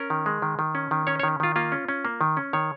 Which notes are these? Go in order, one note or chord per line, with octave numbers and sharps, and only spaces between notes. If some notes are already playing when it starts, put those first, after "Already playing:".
Already playing: C#4 A#4
D#3
G#3
D#3
D#3
C#4
D#3
C#4 C#5
C#5
D#3
D#3 F4
A#3 F4
C#4
C#4
A#3
D#3
C#4
D#3 C#5